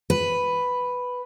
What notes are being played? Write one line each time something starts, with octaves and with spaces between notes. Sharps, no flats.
B4